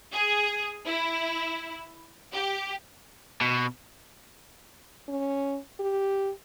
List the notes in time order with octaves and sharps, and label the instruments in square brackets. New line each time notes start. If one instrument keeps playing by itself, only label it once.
[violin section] G#4
E4
G4
[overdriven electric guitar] B2
[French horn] C#4
G4